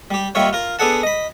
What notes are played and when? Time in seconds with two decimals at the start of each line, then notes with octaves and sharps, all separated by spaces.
0.11 G3 G4
0.35 D#2 D#3 G3 E4 F4 C#5
0.53 F4 A#4
0.79 B3 D4 G#4 A4 F#5 A5
1.03 D#5 B5